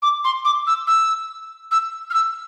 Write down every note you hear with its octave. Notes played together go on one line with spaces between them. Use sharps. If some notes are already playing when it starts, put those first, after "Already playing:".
D6
C6
D6
E6
E6
E6
F6
E6